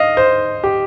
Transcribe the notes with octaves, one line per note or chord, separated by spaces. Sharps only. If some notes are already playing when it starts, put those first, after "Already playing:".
Already playing: D#5 F5
C5
G4